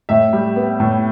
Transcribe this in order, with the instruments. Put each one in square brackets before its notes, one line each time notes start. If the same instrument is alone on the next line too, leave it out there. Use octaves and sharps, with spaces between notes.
[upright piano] A2 E5
G3
B3
A2